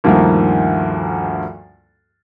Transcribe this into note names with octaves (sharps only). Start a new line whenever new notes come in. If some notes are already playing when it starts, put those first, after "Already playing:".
D2 G2 D#3 F3 A#3